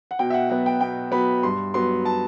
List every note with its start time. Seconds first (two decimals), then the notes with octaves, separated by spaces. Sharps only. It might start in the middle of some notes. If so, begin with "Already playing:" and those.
0.11 F#5
0.19 B2 G5
0.30 E5
0.34 F#5
0.50 F#3 B3 F#5
0.66 G5
0.81 B2 G5
1.12 F#3 B3 B5
1.43 G2 C6
1.74 F#3 B3 C6
2.05 A5